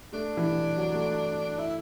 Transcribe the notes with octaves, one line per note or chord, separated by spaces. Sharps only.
A3 D4
E3
F#3
A3
E4